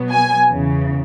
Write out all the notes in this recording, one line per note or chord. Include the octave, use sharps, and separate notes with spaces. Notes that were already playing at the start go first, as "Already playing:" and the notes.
Already playing: B2 F#3 B3
G#5
E2 C#3 E3